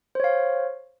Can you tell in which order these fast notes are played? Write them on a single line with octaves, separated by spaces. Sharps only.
C5 C#5 F5